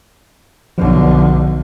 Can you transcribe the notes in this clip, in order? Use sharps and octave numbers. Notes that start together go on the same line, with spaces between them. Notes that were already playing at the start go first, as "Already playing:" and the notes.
B1 D3 F3